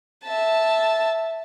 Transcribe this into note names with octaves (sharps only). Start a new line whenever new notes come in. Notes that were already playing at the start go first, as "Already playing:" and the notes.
E5 A5